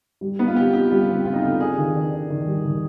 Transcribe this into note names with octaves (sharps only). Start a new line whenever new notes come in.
G3
B3 D#4
F4
C4 G4
D#4 G4
G3 F4
C4
C4 F4
D#4
D3 F4
D4 G#4
D#3
D4
D4
D#3
G3
D#3